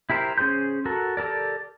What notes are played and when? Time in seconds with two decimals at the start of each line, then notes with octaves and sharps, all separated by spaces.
0.10 E4 G4 A#4 C5
0.38 C#4 G#4 C5 C6 G6
0.85 F#4 A4 A#4
1.17 G4 A4 A#4 D5